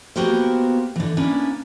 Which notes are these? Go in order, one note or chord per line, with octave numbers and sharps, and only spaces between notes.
A#3 B3 F#4 G4 A#4 C5
D3 E3
A#3 B3 C#4 D4 E4 B4